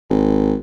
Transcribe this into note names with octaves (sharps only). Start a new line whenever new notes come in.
G#1